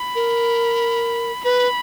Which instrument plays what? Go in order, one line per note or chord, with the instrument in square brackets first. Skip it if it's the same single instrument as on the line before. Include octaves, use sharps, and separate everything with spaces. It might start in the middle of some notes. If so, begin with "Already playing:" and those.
Already playing: [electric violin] B5
[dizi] A#4
[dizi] B4 [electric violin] B5